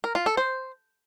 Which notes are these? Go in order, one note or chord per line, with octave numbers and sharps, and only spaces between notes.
A#4
F4
A4
C5